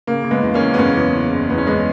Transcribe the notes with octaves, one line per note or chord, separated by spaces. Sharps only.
C#3 A#3
C#3
G#3 B3
E2
A#3 C#4
E2
B3
F#1 A#3 C#4
E2
F#1
F#1
E2 B3
C#4
E2 G#3 B3